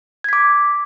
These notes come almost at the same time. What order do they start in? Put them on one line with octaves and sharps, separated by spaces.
G#6 B6 D6